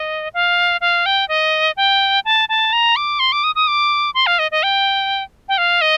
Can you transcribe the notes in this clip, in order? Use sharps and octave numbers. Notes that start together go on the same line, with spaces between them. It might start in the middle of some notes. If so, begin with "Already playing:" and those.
Already playing: D#5
F5
F5
G5
D#5
G5
A5
A5
A#5
D6
C6
D6
D#6
D#6
D6
C6
F5
D#5
D#5
G5
G5
F5
D#5